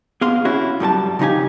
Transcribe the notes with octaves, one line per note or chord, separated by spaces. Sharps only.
B3 G#4 F5 C6
C#4 E4 F#4
F#2 G3 A4 A5
C#3 F3 D#4 G4 G#5